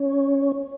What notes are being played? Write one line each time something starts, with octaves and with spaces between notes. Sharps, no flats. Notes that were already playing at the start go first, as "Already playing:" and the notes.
Already playing: C#4